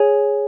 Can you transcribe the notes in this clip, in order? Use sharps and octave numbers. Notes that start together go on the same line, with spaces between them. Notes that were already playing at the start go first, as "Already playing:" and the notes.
Already playing: G#4 C#5 G#5